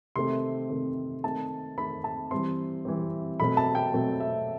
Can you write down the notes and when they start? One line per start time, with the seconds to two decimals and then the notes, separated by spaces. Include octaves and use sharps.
0.16 C3 D#3 A3 C4 C6
0.69 C3 D#3 A3 C4
1.23 D#3 A3 C4 A5
1.77 D#3 A3 C4 B5
2.04 A5
2.31 E3 G3 C4 C6
2.85 E3 G3 C4
3.40 B2 F#3 A3 C4 B5
3.57 A5
3.75 G5
3.94 B2 F#3 A3 C4
4.20 E5